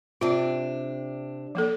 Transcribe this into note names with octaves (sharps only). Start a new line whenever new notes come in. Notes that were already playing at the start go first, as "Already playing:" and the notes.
C3 D4 F4
F3 A#3 A4